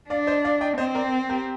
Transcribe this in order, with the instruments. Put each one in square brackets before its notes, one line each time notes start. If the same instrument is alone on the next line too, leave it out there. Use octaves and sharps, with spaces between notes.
[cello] D4 [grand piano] D5 F5
[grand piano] C5 D#5
D5 F5
D#5 G5
[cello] C4 [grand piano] C5 D#5
[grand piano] A#4 D5
G4 A#4